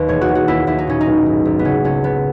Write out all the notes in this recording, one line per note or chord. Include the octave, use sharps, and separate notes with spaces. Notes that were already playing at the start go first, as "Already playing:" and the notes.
Already playing: D#2 B4
E1 C#5
F#4
E1
F#4
D#2 E4
D#2 E4
D#4
A#2 C#4
D#4
B1
G#1
G#1
B3
C#3 C#4
C#2 C#4
C#3 B3